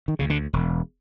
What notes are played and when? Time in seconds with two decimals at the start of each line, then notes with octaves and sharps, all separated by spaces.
0.08 D#3
0.19 D2 C#3
0.30 D3
0.53 E1